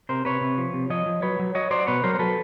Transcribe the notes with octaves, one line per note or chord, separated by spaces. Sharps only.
C3 A#4 C5
C3 B4 C#5
C3
F3
C3
F3 C#5 D#5
F3
F#3 B4 C#5
F#3
F#3 C#5 D#5
F#3 C5 D5
B2 B4 C#5
F#3 A#4 C5
C5
F#3 A4 B4